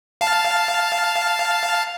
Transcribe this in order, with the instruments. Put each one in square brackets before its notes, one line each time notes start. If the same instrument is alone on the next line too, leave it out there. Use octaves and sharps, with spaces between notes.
[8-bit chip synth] F5 A5